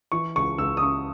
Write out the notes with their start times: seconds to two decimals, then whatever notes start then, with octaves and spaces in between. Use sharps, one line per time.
0.12 E3 C#6
0.36 C#2 C#6
0.58 C#2 E6
0.77 D#6
0.81 C#3 C#6